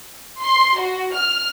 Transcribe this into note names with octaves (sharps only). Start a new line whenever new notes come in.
C6
F#4
F6